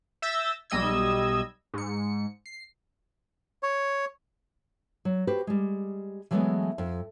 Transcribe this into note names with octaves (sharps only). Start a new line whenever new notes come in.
E5 E6 G6 A6 A#6
B1 G3 D#5 E6 G#6
G#2 C#7
C7
C#5
F#3
F#4 G4 B4 C5
G3 G#3
E3 F#3 G#3 A3 B3
F2